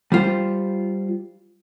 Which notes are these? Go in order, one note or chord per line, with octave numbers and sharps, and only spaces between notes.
G3 F4 C5